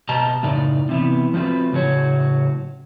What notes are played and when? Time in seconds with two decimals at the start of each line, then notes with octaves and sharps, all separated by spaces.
0.09 B2 G4 D#5 A5 A#5
0.43 F#2 A2 C#3 D#4 D5
0.89 C3 E3 B3
1.34 F3 A3 C4 F4 F#4 B4
1.73 A2 C#3 F#3 F#4 C#5